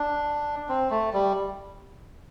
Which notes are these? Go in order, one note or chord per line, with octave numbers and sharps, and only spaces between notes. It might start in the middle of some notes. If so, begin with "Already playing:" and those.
Already playing: D4
C4
A3
G3